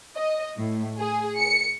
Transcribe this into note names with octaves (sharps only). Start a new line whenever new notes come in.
D#5
A2
G#4
C#7